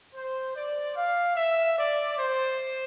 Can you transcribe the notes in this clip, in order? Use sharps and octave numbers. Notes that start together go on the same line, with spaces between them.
C5
D5
F5
E5
D5
C5